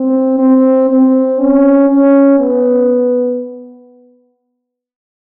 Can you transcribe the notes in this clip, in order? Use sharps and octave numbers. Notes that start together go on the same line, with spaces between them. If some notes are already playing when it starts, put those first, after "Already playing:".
Already playing: C4
C4
C4
C#4
C#4
B3